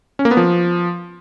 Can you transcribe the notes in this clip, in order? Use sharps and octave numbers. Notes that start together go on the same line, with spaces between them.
C#4
A#3
B3
F3